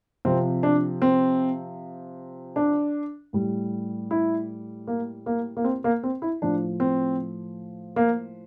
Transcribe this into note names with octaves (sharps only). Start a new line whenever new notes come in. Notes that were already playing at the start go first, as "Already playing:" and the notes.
C3 F3 C4
D4
C4
D4
A2 G3
E4
A#3
A#3
A#3
C4
A#3
C4
E4
A2 F3 D4
C4
A#3